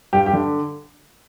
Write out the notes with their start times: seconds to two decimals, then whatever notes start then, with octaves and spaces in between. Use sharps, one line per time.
0.13 G2 G4
0.26 G4
0.33 D3